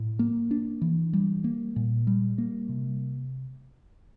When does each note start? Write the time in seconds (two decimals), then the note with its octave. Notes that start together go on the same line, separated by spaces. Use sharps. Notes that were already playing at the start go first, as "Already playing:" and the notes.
Already playing: A2
0.19 A#3
0.51 D4
0.81 E3
1.13 G3
1.44 A#3
1.76 A#2
2.07 G3
2.38 A#3
2.69 C3